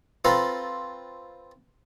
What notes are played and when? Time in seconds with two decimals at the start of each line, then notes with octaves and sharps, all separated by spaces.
0.25 C4 F4 A4 B4 A#5 C6